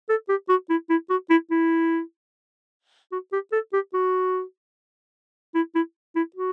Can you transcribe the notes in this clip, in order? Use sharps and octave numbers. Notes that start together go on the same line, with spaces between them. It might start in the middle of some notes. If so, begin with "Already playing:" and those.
A4
G4
F#4
E4
E4
F#4
E4
E4
F#4
G4
A4
G4
F#4
E4
E4
E4
F#4